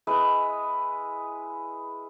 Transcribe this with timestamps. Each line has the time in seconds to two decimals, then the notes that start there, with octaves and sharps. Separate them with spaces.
0.07 G#3 E4 B4 D#5